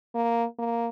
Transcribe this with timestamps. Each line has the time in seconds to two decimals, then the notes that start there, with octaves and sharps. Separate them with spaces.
0.15 A#3
0.59 A#3